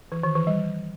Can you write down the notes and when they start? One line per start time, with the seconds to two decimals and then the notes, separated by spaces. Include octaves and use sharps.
0.12 E3
0.23 D#3
0.35 E3
0.47 G3